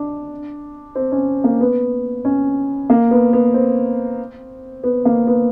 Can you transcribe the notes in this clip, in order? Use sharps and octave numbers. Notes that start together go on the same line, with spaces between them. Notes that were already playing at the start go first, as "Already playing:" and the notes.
Already playing: D4
C4
C#4
A#3
B3
C#4
A#3
B3
B3
C4
B3
A#3
B3